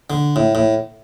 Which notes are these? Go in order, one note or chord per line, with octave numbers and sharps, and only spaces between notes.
D3
A2
A2